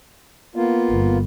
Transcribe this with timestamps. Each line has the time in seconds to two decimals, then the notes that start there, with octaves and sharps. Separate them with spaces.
0.56 A#3 B3 F4
0.90 G1